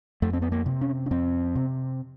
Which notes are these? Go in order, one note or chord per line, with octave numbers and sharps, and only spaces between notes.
F2 A3
C4
B3
A#3
C3
C#4
C#4
F2 C4
C3